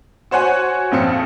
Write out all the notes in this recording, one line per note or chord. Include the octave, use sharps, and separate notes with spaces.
F#4 C5 C#5 F#5 G#5
A#1 F2 C4 F5 C#7